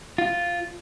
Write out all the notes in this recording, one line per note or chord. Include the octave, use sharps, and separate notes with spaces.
F4